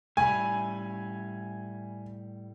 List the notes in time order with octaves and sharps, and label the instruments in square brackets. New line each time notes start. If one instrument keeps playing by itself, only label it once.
[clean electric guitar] A2 G3 B5 [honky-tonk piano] G#5